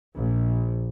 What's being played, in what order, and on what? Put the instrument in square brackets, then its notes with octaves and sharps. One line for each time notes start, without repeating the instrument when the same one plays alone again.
[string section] A#1